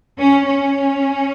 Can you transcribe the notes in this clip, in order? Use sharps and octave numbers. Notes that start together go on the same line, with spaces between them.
C#4
C#4